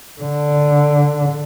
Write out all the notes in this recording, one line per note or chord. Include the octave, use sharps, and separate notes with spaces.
D3